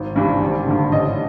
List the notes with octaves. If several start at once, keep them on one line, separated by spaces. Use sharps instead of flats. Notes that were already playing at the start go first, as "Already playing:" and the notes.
Already playing: G#1
G2 E3 G3
G#1
G2 D3
A1 D#5